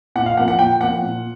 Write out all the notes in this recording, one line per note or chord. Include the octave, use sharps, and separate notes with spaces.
A#2 F#5
F5
F3 A#3 F#5
F#5
A#2 G5
F3 A#3 F#5
A#2